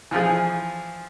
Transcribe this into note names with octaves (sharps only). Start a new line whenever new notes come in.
E3 F3 F4 G#4